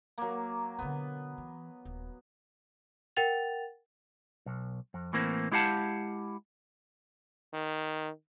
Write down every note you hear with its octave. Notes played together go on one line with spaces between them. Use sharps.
F#3 A#3
B2 D3 B3
E3
D#1
A#4 F#5 G5 A6 F7
B1
F2
A2 E3 A#3 C4
G#3 E4 G4 F5 F#5 A5
D#3